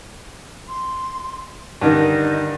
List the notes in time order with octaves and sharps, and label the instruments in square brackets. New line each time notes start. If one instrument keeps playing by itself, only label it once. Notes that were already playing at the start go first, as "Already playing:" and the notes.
[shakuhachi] C6
[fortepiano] G2 D3 D#3 [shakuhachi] D#4